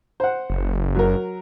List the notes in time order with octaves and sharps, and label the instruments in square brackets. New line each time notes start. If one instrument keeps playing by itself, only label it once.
[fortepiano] C5 F#5
[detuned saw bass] F#1
[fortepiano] F#3 A#4